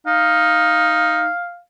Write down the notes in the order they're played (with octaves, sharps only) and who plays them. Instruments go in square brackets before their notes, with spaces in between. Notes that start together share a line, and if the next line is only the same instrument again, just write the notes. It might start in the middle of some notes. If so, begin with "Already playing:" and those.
[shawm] D#4 [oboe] F5